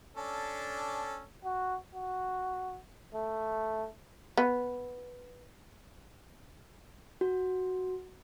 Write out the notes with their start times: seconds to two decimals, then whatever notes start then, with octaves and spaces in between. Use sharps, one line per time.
0.16 C#4 D4 A4
1.45 F#4
1.95 F#4
3.15 A3
4.37 B3
7.21 F#4